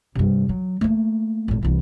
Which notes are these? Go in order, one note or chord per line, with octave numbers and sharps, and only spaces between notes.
G2 C3
F#3
A3 A#3
G#1 A2
C2 E3